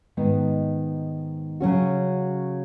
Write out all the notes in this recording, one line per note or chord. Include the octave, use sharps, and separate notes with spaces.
G#2 D#3 B3
C#3 F#3 C#4 F#4